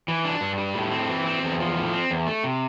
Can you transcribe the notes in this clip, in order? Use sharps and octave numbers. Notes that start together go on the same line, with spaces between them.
E3
D4
G2
G3
A2
C4
E3
C4
E2
F3
A2
C4
E2
A3
C3